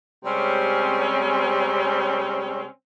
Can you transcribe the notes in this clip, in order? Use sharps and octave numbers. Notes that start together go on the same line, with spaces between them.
C3 G3 G#3 C4 C#4